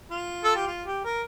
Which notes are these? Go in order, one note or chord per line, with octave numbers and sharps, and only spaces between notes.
F4
A4
G4
F4
G4
A#4